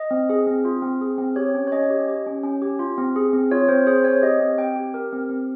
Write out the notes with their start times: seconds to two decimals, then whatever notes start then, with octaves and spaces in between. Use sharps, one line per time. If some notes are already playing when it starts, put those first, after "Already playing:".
Already playing: D#5
0.11 C4
0.30 G#4
0.47 C4
0.65 F4
0.82 C4
1.01 G#4
1.18 C4
1.36 G4 C#5
1.55 C#4
1.67 C#5
1.72 C#4 D#5
1.90 G4
2.08 G4
2.26 C#4
2.43 C#4
2.62 G4
2.79 F4
2.98 C4
3.16 G#4
3.33 C4
3.51 F4 C#5
3.69 C4 C5
3.87 G#4 C5
4.04 C4 C#5
4.22 G4 D#5
4.40 C4
4.58 C4 G5
4.76 G4
4.94 G4 A#4
5.12 C4
5.29 C4